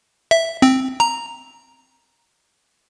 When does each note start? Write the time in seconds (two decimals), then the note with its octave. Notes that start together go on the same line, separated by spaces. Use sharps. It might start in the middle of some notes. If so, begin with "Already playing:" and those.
0.31 E5
0.62 C4
1.00 A#5